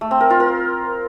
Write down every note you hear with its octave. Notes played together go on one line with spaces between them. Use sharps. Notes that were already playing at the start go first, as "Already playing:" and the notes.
A3
C4
A#4
F4
A#4